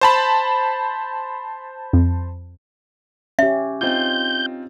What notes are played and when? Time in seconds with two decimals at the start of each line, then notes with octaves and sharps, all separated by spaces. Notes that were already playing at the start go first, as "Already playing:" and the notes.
0.01 C5 A5 B5
1.93 F2
3.39 C#4 G4 E5
3.81 C4 D#4 F4 G6